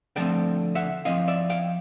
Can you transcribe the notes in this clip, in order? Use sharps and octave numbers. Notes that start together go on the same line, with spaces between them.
D3 F3 A3 C4 G5 A5
E5 F#5
F3 A3 C4 E4 D#5 F5
D5 E5
F5 G5